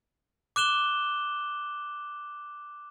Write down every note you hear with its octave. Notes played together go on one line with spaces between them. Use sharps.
D6 F#6 E7 G7